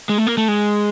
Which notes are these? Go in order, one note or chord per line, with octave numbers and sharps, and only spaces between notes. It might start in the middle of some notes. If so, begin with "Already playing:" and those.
G#3
A3
A#3
A3
G#3